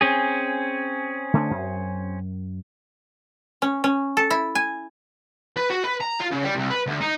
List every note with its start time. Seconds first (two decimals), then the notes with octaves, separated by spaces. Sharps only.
0.01 C4 C#4 G#4
1.33 D3 A3 D4
1.51 F#2
3.62 C#4
3.84 C#4
4.17 A4
4.31 E4
4.55 G#5
5.57 B4
5.70 F#4
5.84 B4
6.00 A#5
6.20 F4
6.31 C#3
6.43 G3
6.55 C2
6.70 B4
6.86 D2
7.01 D#4